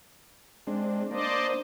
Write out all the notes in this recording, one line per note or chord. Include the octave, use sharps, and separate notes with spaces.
G#3 C4 D4
A#3 D4 C5 D5 D#5